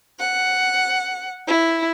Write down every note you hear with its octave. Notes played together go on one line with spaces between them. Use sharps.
F#5
E4